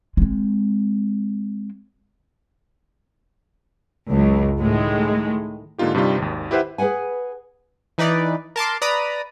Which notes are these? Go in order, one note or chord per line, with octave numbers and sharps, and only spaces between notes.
G#3 C4
C#2 F#2
A2 D#3 G#3
G#2 D3 A#3 D#4 F4 G4
G2 C3 G3 D#4 F4
G#1 D#2
E4 G4 B4 C5 E5 F#5
G#4 B4 C5 F#5 G#5
E3 D#4 B4 D5
A#4 A5 C6 D6
B4 D5 A#5 B5 D#6